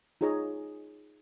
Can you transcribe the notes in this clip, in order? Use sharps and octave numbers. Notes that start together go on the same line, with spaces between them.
D#4 F4 G#4 C#5 A#5